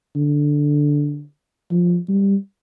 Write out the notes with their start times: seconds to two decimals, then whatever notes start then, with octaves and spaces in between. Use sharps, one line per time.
0.16 D3
1.71 F3
2.09 G3